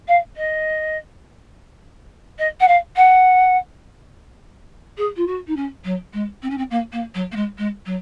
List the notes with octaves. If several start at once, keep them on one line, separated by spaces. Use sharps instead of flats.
F5
D#5
D#5
F#5
F5
F#5
G#4
F4
F#4
D#4
C#4
F#3
G#3
C4
C#4
C4
A#3
A#3
F#3
A#3
G#3
G#3
F#3